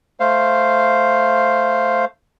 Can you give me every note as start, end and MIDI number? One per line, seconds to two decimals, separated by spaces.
0.20 2.05 57
0.20 2.05 72
0.20 2.05 77